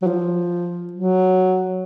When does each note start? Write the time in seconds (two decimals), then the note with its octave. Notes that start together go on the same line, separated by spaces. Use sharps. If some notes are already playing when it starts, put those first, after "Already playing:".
0.02 F#3
0.07 F3
0.93 F#3